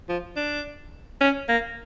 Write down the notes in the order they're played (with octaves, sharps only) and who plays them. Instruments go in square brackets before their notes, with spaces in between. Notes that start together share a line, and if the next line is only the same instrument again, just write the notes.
[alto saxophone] F3
D4
C#4
A#3